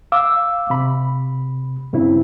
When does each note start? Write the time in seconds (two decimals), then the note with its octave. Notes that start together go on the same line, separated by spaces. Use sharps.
0.12 F5 D6 E6
0.70 C3 B5
1.93 G2 C#3 C4 E4